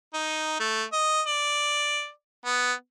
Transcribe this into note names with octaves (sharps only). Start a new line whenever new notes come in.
D#4
A3
D#5
D5
B3